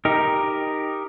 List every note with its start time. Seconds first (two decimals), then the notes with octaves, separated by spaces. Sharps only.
0.05 D#4 G4 A#4